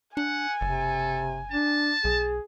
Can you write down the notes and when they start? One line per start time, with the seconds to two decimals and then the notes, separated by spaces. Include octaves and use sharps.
0.17 D4 F#5 G#5
0.61 F#1 C3 A4
1.52 D4 A5
2.05 B1 G#4